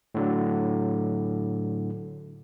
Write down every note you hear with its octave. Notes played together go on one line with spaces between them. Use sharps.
A2 D3 F#3